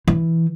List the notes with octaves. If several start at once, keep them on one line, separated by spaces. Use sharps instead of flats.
E3